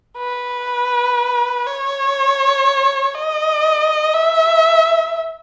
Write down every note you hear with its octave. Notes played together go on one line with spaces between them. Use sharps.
B4
C#5
D#5
E5